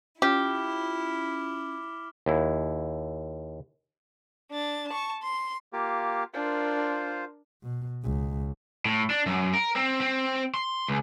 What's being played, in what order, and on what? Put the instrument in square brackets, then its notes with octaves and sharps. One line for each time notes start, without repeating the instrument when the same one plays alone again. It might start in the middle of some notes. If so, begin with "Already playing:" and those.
[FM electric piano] C#4 F4 [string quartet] E4 [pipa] G4 [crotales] D6 F6
[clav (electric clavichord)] D#2 E4
[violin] D4 A6
A5 C#6
C6
[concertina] A#3 F4 G4
[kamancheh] D4 A#4 [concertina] F4 C5
[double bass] B2
C#2
[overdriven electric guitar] A2
D4
F#2
A#4
C4
C4
C6
C#2